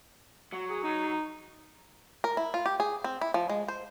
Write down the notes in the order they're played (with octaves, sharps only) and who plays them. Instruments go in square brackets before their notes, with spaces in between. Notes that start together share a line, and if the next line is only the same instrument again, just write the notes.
[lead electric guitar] F#3
[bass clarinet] G#4
D#4
[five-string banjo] A#4
E4
F4
G4
G#4
C4
E4
F3
G#3
C5